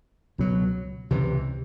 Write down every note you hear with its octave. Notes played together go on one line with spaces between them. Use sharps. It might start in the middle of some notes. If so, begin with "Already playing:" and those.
C#2 B2 F#3
C#2 C3 E3